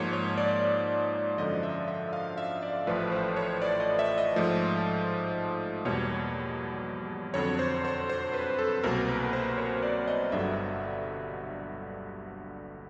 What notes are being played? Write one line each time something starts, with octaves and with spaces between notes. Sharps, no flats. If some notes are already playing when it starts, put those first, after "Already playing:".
Already playing: G#2 F3 A#3 C#5
C#5
D5
F#2 D3 F3 D#5
E5
E5
F5
E5
D5
A1 A2 F3 A3 B4
C5
C#5
D5
D#5
E5
D#5
G#2 F3 A3
E2 B2 G3 A#3 C#5
F2 D3 F#3 C#5
C5
C5
C5
B4
A4
C2 B2 F#3 A#3 A#4
B4
C5
C#5
D5
D#5
G1 G2 D3 F#3 E5